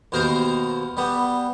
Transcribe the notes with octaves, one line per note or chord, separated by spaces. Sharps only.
D#2 B2 A#4 C5 A#5
G3 B3